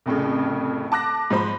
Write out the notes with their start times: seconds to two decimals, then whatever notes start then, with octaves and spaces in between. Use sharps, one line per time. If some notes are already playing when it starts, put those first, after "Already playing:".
0.06 C2 F2 A2 C#3
0.92 A5 D6 F#6 A#6
1.30 G#2 F3 C5 B5